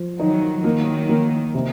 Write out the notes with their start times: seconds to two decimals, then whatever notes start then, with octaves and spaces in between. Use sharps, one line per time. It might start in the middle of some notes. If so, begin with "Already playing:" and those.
Already playing: F3
0.19 D#3 F#3 D#4
0.64 D#3 F#3 A#3
1.09 A#3
1.55 C3